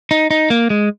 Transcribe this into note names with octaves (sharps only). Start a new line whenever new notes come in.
D#4
D#4
A#3
G#3